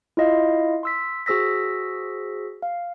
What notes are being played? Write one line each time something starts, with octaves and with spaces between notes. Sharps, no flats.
E4 F4 D#5 F5
C6 E6 B6
F#4 G#4 C5 E6 A#6 B6
F5